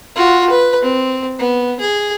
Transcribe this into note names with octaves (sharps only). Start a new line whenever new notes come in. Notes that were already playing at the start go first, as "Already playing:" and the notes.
F4 F#4
B4
C4
B3
G#4